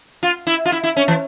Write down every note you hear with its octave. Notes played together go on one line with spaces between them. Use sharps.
F4
E4
F4
E4
E4
C#4
E3